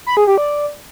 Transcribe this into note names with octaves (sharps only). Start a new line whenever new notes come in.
B5
G#4
G4
D5